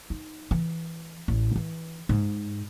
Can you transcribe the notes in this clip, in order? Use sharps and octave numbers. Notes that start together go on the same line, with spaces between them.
D#4
E3
A1
E3
G#2